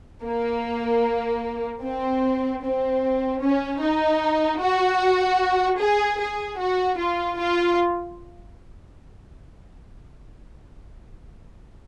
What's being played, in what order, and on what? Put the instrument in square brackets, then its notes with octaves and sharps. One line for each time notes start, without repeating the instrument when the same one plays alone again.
[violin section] A#3
C4
C4
C#4
D#4
F#4
G#4
G#4
F#4
F4
F4